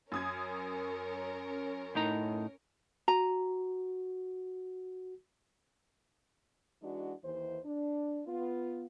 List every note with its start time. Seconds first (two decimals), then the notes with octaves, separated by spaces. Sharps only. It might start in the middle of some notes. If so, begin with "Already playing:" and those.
0.12 F#2 C#4 A#4 D#6 G#6
1.95 A2 D#4 A#5
3.08 F#4 A#5
6.82 E3 G#3 D4 D#4 F#4
7.23 D#2 E3 C5
7.64 D4
8.27 B3 F4